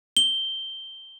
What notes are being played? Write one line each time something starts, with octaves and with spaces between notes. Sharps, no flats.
G7